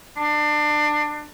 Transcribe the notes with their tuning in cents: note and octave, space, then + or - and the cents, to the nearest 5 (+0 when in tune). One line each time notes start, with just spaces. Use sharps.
D4 +25